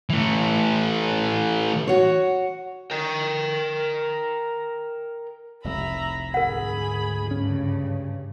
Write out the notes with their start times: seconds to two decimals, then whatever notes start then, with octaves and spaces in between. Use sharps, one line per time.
0.10 E3 A3
1.87 F#4 C#5
2.91 A#4 G5
5.64 F1 C2 E5 A#5 B5
6.34 D2 G#2 G#4 A#4 F#5 B5
7.31 G2 C#3 C#4